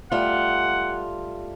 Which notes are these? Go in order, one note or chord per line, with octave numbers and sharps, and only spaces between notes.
G3 A3 F4 F#5